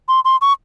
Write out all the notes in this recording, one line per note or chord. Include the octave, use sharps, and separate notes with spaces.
C6
C6
C#6